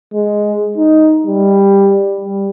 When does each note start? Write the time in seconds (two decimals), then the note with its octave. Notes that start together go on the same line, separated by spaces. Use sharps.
0.13 G#3
0.77 D#4
1.26 G3
2.21 G3